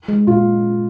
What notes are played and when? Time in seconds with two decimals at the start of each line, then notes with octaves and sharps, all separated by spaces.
0.08 G#3
0.27 A#2 F4